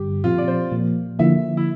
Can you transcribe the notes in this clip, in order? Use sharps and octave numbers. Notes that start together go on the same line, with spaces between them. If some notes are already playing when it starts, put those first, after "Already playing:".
Already playing: G2 D3 G3 G4
A#2 F3 C4 F4
D5
C5
A#2 F3 A#3
D3 F3 A#3 E4 E5
E4